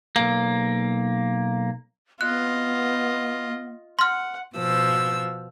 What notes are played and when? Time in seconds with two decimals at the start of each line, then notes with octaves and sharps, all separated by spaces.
0.16 B1 A#3
2.21 B3 F4 D#5 F#6
3.99 F#5 C6 F6
4.56 B2 F3 E6